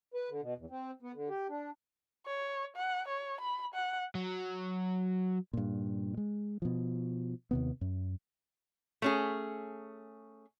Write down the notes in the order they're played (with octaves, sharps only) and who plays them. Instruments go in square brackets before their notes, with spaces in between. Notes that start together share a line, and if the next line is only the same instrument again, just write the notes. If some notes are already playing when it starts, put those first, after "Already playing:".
[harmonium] B4
D3
B2
E2
C4
B3
D3
G4
D4
[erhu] C#5
F#5
C#5
B5
F#5
[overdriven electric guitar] F#3
[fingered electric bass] G2 A#2
G#3
B2 F3
D#2 C3 B3
F#2
[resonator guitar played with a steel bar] A3 C#4 G#4